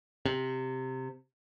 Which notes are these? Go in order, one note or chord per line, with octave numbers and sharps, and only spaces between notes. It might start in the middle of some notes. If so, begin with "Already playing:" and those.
C3